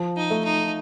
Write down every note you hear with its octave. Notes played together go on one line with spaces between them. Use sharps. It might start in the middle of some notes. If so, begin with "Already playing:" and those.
Already playing: F3
D#4
A3
D#4